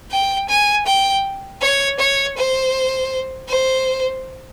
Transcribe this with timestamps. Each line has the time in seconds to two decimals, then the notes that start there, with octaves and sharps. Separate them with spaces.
0.12 G5
0.49 G#5
0.86 G5
1.62 C#5
2.00 C#5
2.37 C5
3.49 C5